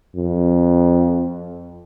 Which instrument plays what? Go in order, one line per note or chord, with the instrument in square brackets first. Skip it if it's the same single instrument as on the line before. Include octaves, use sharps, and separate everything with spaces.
[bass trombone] F2